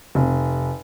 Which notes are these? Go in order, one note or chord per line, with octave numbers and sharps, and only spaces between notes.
F1